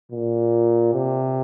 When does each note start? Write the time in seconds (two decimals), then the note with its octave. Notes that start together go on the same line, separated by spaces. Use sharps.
0.12 A#2
0.93 C3